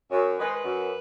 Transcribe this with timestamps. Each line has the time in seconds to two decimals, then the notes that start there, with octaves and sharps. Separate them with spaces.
0.10 F#2 C#5
0.38 D#3 G#3 B4
0.46 C5
0.54 B4
0.64 F#2